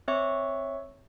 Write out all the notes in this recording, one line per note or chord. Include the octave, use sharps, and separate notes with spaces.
C4 C#5 E5 C#6